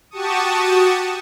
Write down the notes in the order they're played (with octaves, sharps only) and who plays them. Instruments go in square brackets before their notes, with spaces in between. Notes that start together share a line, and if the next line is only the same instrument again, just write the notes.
[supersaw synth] F#4 G4 A5 C#6 D#6